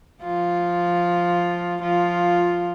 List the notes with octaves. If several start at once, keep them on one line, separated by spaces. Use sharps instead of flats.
F3 F4
F3 F4